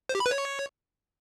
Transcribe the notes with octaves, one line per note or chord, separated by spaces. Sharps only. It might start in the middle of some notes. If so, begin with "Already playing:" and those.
C5
G4
B5
B4
C#5